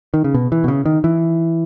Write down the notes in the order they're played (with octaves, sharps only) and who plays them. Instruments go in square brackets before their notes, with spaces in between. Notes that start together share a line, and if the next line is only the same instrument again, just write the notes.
[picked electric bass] D#3
C#3
B2
E3
B2
C#3
D#3
E3